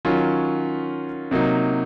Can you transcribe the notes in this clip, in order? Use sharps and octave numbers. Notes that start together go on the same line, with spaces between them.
D#3 F#3 C#4 F4
C3 F#3 A#3 D#4